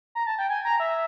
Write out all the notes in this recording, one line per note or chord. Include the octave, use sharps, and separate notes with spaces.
A#5
A5
G5
G#5
A#5
E5